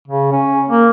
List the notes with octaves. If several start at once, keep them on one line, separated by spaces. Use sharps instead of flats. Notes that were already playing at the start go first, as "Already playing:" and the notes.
C#3
C#4
A#3